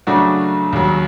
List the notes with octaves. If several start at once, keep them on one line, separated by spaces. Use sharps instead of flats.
C#3 F#3 A3 D4 F#4
D#2 C#3 F#3